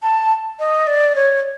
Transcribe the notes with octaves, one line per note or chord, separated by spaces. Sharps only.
A5
D#5
D5
C#5